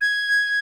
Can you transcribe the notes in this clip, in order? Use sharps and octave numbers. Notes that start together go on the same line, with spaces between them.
G#6